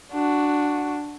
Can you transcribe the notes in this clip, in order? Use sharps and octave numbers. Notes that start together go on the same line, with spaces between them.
D4 F#4